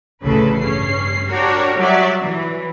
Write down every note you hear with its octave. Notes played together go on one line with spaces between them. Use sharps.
A1 D2 C#3 A4 B4
G2 C#4 C7
D4 F#4 G4 A#4 C#5
F#3 G3 D5 E5
E3